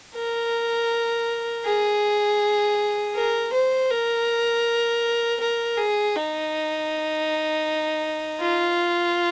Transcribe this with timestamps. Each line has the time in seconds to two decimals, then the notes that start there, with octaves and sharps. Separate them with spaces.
0.15 A#4
1.65 G#4
3.14 A#4
3.53 C5
3.91 A#4
5.40 A#4
5.77 G#4
6.16 D#4
8.41 F4